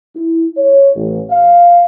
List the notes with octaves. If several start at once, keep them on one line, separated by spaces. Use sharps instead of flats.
E4
C#5
A1
F5